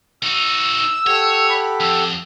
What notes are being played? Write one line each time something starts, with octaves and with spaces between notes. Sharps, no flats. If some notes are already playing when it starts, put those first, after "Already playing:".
D#4 F#4 E6
G4 A4 C#5 F#5
B5
F2 E6